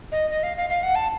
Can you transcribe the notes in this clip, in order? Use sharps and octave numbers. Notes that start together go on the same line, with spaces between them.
D#5
D#5
F5
F5
F5
F#5
A5